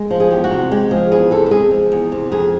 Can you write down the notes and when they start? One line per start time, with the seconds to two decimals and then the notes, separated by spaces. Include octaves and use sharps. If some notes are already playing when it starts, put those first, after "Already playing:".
Already playing: G#3
0.11 F3
0.20 G#4
0.31 E2 G4
0.44 F#4
0.51 C3
0.71 G#3 G4
0.91 F3 G#4
1.12 E2 G#4
1.31 C3 A4
1.46 A4
1.51 G#3 G#4
1.71 F3
1.92 E2
2.12 C3
2.32 F2 G#4